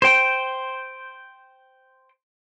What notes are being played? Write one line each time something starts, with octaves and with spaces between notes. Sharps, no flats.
C5 G5